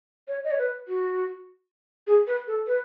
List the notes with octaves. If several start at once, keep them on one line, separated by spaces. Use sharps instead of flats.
C#5
D#5
C#5
B4
F#4
G#4
B4
A4
B4